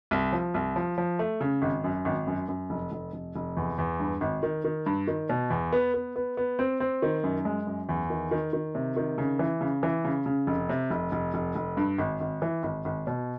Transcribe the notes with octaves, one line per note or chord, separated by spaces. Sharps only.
C2
F3
C2
F3
F3
A3
C#3
G#1
F#2
G#1
F#2
F#2
F1
F1
F1
F1
E2
E2
G2
G#1
D#3
D#3
G2
D#3
B2
E2
B3
B3
B3
B3
C4
C4
D#3
F#2
G#3
F#2
E2
D#3
D#3
D#3
C3
D#3
C#3
E3
C#3
E3
C#3
C#3
F1
C3
F1
F1
F1
F1
G2
G#1
G#1
E3
G#1
G#1
B2